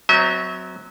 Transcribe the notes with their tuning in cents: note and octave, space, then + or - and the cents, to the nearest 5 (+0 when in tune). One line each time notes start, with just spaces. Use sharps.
F#3 +0 C4 -20 E5 -40